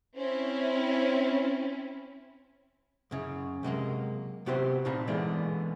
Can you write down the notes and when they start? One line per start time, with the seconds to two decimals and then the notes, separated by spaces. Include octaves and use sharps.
0.16 C4 C#4 E4
3.11 F#2 C#3
3.63 C3 F#3 G#3 A#3
4.46 C3 B3 F#4 G4 C5
4.85 A#2 C4 D#4 F5 A5 B5
5.07 D3 E3 G#3 A#3 B3 D4